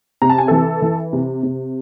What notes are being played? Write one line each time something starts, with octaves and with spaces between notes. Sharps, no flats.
C3 A#5
A5
G#5
E3 A4 A5
E3
C3
C3